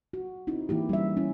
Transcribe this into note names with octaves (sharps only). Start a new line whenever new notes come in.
F#4
C4 D#4 E4
E3 A#3 E4 G4
G3 C#4 E5
C#4 E4